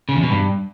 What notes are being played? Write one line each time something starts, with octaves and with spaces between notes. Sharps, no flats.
C#3
E2
B2
G2